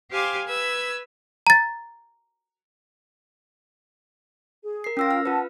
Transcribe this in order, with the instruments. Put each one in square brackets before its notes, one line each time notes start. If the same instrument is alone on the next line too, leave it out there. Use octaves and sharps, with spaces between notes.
[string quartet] G4 C5 F5 G#5 D6
B4 E6 G#6
[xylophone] A#5 A6
[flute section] G#4
[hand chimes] A#4 C7
[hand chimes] C#4 E6 A#6 [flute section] F4 A#4 G5
[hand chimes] F6
[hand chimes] F4 B4 [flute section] F#5 A5